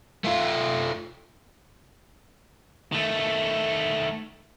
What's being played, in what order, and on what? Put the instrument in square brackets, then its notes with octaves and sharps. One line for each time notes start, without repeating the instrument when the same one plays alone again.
[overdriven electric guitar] A3 F4
[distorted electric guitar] D#3 A3